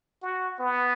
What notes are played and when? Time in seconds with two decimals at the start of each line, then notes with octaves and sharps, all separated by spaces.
0.22 F#4
0.59 B3